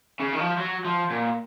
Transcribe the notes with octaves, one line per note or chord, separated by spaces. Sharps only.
C#3
D#3
F3
F#3
F3
A#2